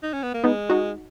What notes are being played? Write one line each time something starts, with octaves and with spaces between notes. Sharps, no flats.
D#4
C#4
B3
A#3
G#3 B3 D#4
D#4 F#4